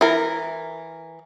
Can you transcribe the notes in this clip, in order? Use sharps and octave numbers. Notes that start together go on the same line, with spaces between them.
E3 A#4